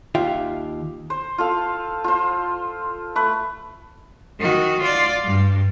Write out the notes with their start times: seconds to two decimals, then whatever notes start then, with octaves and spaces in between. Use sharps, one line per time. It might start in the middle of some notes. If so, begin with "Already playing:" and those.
0.15 D#2 F4 E5 G5
1.10 C5
1.38 F4 A4 F5
2.04 F4 C5
3.16 A3 B4
4.40 D#3 F#4
4.80 F4 D5
5.25 G2